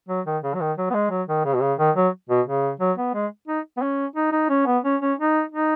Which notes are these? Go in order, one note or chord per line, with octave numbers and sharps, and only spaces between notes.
F#3
D#3
C#3
F#3
D#3
F#3
B3
G#3
F#3
D#3
C#3
B2
C#3
D#3
F#3
B2
C#3
F#3
B3
G#3
D#4
B3
C#4
D#4
D#4
C#4
B3
C#4
C#4
D#4
D#4